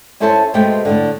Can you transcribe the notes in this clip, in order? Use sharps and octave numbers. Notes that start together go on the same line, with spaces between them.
C#4 E4 A4 C5 C#5 A5
B2 G#3 A3 C4 G4 G5
A2 D3